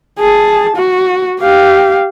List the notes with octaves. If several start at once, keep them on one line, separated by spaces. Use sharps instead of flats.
G#4 A5
F#4
G4 F5